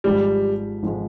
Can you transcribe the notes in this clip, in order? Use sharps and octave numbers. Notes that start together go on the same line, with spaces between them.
G#1 G#2 F3 G3 G#3
G#1 F3 G#3